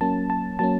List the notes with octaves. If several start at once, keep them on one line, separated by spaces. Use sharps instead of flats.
F#3 A#3 C#4 A5
A5
F#3 A#3 C#4 A5